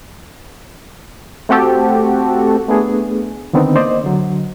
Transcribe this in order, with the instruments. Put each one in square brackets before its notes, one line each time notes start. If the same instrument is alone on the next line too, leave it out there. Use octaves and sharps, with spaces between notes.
[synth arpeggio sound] A3 C4 F#4 G4 A4
[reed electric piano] A3 B3 D4 G#4
D3 D#3 B3 C4 D4 D#4
A#3 C5 D5 D#5
D3 F#3